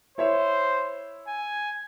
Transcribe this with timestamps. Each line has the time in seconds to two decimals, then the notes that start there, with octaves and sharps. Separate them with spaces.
0.18 E4 C5 C#5 E5
1.28 G#5